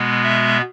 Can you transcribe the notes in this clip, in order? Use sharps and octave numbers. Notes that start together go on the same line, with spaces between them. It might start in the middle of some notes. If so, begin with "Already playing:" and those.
Already playing: B2 G#3 B3
E5